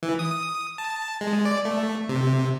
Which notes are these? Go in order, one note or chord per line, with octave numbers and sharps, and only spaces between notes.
E3
D#6
A5
G#3
D5
A3
C3